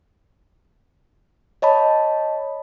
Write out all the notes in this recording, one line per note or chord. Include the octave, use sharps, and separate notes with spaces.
C#5 D#5 A5 B5